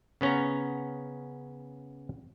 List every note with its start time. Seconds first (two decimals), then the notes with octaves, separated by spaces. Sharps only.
0.21 C#3 B3 C#4 C#5 A#5